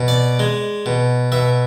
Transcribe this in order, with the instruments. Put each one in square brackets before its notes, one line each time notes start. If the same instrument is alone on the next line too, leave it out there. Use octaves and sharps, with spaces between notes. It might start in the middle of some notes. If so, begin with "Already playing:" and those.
Already playing: [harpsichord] B2
D5
G#3
B2
B2 E5